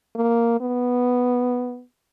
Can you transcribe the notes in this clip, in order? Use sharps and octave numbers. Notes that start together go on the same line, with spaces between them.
A#3
B3